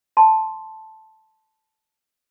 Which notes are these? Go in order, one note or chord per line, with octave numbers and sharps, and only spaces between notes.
A5 C6